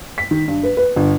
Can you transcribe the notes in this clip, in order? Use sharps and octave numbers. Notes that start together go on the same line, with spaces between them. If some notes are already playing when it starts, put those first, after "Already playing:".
B6
D#3
G2
B4
B4
G1